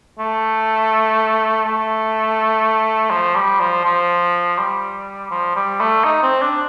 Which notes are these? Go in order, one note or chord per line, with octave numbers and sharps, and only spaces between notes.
A3
A3
F3
G3
F3
F3
G3
F3
G3
A3
D#4
C4
D4